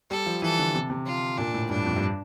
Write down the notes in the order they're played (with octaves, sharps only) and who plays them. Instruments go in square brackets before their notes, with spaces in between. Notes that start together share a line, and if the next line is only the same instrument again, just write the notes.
[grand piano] G3 [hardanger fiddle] A4
[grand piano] F3
[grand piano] E3 [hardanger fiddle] A4
[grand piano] D3
C3
C3
[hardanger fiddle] F4
[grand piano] A#2 [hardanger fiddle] D4
[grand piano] A2
[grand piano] G2 [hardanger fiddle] D4
[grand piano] F2
G2